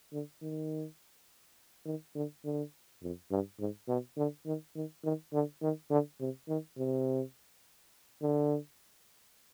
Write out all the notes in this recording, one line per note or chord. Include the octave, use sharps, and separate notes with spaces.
D3
D#3
D#3
D3
D3
F2
G2
G#2
B2
D3
D#3
D#3
D#3
D3
D#3
D3
C3
D#3
C3
D3